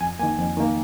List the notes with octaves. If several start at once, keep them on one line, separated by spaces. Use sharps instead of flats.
F2 G#5
D#3 A#3 G#5
F2
D#3 A#3